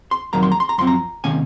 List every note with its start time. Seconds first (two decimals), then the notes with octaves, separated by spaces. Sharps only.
0.11 C6
0.33 F2 D#3 F#3 A#3 A#5
0.43 C6
0.52 A#5
0.60 C6
0.69 A#5
0.78 F#2 F3 C4 C6
0.87 A#5
1.24 C3 D#3 A#3 C#4 G#5